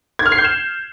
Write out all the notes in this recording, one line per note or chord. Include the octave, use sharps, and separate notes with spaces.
G#6
F6
C7
G6
E7